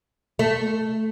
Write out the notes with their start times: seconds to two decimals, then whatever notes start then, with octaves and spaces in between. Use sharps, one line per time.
0.39 A3